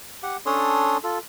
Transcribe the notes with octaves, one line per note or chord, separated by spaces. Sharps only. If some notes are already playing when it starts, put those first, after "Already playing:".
G4 F#5
C#4 D4 A4 C#5 C6 D#6
F4 A4